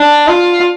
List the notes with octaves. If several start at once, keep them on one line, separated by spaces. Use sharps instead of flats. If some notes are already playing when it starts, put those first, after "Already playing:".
Already playing: D4
F4